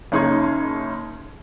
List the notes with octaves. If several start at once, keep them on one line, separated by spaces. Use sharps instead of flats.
F#1 C#4 D#4 G#4 C6 G#6